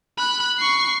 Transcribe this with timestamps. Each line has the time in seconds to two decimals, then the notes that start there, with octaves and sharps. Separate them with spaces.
0.17 B5 F#6
0.59 C#6 C7